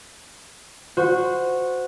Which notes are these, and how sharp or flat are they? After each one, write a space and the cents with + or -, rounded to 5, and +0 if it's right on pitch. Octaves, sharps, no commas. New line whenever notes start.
F#4 -15 C5 -20